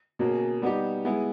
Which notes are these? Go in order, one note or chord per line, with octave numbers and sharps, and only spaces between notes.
B2 A#3 C#4 G#4
G3 B3 D#4 G4
G#3 B3 E4 G#4